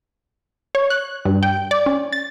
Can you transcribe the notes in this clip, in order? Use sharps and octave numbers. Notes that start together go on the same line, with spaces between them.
C#5
F#6
G2
G5
D5
C#4
A6